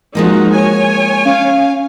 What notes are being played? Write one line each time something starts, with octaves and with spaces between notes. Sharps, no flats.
F3 G#3 A#3 D#4 F#4
C#5 G#5
C#4 F5